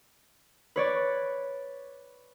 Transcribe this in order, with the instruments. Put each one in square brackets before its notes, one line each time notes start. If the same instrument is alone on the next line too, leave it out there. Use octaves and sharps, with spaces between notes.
[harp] B4 C#5 D5